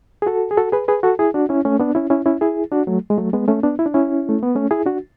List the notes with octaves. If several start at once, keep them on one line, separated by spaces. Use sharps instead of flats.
G#4
F#4 A4
G#4
F#4 A4
G#4 B4
G#4 B4
F#4 A4
E4 G#4
D4 F#4
C#4 E4
A3 C#4
B3 D4
C#4 E4
C#4 E4
C#4 E4
E4 G#4
D4 F#4
F#3 A3
G#3
F#3 A3
G#3 B3
A3 C#4
B3 D4
E4
D4
C#4 E4
A3
B3
A3 C#4
E4 G#4
D4 F#4